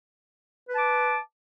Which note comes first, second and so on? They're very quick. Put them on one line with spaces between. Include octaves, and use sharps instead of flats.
B4 A5 D6